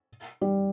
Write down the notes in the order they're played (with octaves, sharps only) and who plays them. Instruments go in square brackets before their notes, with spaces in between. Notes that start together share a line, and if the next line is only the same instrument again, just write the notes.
[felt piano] G3